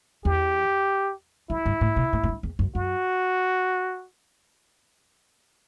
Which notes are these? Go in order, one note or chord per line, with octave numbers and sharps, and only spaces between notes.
E2 G4
F#2 E4
G2
A2
B2
A2
A2
G2
E2
F#2
F#2 F#4